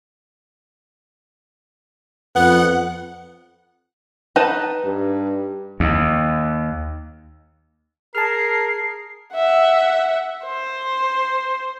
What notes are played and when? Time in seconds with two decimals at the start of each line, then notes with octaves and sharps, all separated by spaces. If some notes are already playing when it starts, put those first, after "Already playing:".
2.36 F2 B3 F#5
4.36 D#4 B4 A5
4.85 G2
5.80 D#2
8.15 G#4 A#4 A5 F6 C7
9.35 E5 F#5
10.45 C5